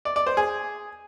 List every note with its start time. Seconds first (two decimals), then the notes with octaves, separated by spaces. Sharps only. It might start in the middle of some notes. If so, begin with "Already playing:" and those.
0.05 D5
0.16 D5
0.27 C5
0.37 G#4